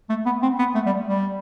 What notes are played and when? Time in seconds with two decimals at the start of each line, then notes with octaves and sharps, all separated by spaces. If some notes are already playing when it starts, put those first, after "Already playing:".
0.10 A3
0.26 B3
0.43 C4
0.59 B3
0.75 A3
0.86 G3
1.08 G3